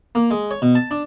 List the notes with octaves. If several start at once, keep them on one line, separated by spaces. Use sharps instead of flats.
A#3
G#3
C#5
B2
A5
D4